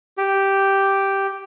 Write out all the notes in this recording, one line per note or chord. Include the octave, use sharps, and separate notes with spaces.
G4